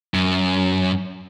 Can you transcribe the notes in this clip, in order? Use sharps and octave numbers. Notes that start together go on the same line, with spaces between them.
F#2